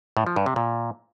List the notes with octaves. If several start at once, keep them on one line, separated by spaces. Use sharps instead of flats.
A2
F3
G2
C3
A#2